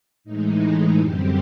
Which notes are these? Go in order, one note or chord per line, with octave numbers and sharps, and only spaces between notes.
A2 E3 G#3 D#4
F#2 D3 G3 C4 G4